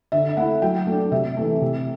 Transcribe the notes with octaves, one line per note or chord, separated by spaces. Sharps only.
D3 E5
A3 E4 F#5
F#3 G5
A3 D4
C3 E5
E3 A3
C3